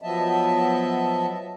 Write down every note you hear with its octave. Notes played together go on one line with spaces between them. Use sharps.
F3 F#3 B3 D#5 E5 A5